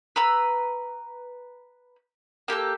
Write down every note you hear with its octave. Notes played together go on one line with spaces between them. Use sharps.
B4 A#5 E6
A#3 G4 A4 E6